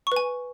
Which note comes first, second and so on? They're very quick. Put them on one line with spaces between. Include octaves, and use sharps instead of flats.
C#6 B4 G#5